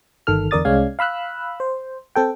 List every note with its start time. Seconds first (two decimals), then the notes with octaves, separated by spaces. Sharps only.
0.27 G1 D#3 A4 F6
0.51 E2 D3 A#4 D5 D#6 A6
0.65 C2 G#3 C#4 D5 F5 G#6
0.99 F5 B5 E6 F#6
1.60 C5
2.16 C4 A4 G5